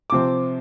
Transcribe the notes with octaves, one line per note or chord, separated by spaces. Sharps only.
C3 F3 C4 D6